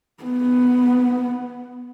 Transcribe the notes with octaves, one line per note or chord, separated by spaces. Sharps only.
B3